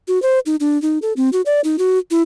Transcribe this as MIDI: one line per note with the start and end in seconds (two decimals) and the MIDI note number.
0.08 0.21 66
0.22 0.39 72
0.46 0.56 63
0.60 0.80 62
0.82 0.99 63
1.02 1.13 69
1.17 1.29 60
1.33 1.42 66
1.46 1.61 74
1.64 1.76 63
1.79 1.98 66
2.11 2.22 64